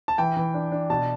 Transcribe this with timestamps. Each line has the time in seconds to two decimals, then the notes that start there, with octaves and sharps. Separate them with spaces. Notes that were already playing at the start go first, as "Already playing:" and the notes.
0.08 A5
0.18 E3 G5
0.37 E3
0.54 D4
0.72 D4
0.90 B2 A5